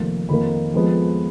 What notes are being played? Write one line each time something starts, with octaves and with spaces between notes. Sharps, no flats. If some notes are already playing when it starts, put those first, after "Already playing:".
Already playing: F1 F2 D#3 A#3
F2 D#3 A#3 B5
F2 F3 G#3 B3